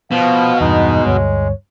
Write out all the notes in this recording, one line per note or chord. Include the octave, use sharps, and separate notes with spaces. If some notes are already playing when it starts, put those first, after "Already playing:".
B2 F3 F5
E2 G2 G#3 D#4
D2 G2 C#5